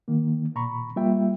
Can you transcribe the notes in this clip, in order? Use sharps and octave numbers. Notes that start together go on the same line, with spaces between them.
D#3 A#3
A#2 A#5 B5 C#6
G3 A#3 F4 E5 G5